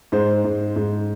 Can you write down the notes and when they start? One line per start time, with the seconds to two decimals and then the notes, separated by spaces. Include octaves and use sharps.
0.12 G#2 C5
0.44 G#2
0.76 G#2